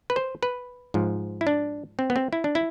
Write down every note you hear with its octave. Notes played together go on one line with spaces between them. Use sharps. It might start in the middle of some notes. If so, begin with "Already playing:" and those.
B4
C5
B4
G#2 F3
E4
D4
C4
B3
C4
E4
D4
E4